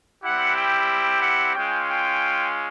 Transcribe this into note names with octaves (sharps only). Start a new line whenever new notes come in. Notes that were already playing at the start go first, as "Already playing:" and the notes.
G3 C4 E4 G4 F#5
G5
F#5
G#3 C#4 F4 G5
G5